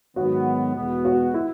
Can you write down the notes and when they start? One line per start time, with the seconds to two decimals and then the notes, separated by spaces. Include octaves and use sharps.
0.16 G#2 D#3 F#3 B3 F#4
0.75 E2 B2 G#3 B3
1.05 F#4
1.34 E4